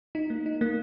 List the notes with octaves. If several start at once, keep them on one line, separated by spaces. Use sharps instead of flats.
D#4
A#3
D#4
A#3